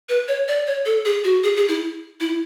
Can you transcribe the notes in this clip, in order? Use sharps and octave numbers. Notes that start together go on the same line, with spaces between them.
B4
C#5
D5
C#5
A4
G#4
F#4
G#4
G#4
E4
E4